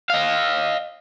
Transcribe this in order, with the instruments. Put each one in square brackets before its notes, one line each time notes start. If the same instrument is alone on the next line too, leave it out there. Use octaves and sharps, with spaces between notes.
[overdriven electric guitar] D#5 F5